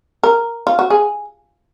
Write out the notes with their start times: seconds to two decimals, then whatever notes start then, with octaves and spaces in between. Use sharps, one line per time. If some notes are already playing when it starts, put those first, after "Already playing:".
0.23 A#4
0.67 F4
0.79 F#4
0.90 G#4